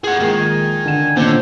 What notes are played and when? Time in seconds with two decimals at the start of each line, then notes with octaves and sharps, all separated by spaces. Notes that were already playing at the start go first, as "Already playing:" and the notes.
0.04 G#4 F#5 G#5
0.19 A#1 D#3 G#3 C7
0.86 D3 E7
1.16 A#2 D3 D#3 C#4 D4 C5